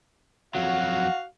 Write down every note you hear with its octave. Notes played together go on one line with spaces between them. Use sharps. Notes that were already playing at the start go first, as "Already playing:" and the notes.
F2 F#3 F#4 F5 F#5